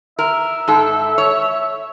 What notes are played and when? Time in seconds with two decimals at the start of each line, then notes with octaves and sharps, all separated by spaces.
0.19 A#4 E5
0.68 G#2 A4
1.18 C#5